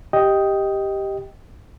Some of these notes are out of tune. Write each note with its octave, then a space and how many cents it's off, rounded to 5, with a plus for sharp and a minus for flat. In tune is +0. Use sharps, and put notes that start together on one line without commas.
G4 +0 D#5 +5 G5 +0